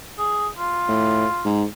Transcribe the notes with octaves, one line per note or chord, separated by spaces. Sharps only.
G#4
F4
A2
G#2